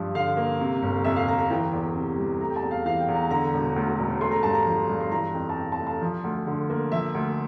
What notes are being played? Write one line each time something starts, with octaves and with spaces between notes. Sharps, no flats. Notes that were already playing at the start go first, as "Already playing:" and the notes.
Already playing: G2 F3
D3 F5
A#3
C3
G1
F2 E5
F5
G1 A#5
A#5
E3 G5
E2
C3
G3
A3 A#5
G5
A5
E2
F5
E3 F5
G5
E2
A#5
D3 A#5
E1
D2
E1
A3 C6
A#5
G2 A5
A#5
F3
G2
C6
E3 A#5
F2 G5
A5
C3 G5
A5
A3
A5
F3
D2
D3
A#3
F3 E5
D2